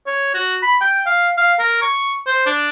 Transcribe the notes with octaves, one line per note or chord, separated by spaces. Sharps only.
C#5
F#4
B5
G5
F5
F5
A#4
C#6
C5
D4